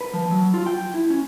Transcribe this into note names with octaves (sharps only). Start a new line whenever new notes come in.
B4
F3
F#3
F4
G5
E4
C#4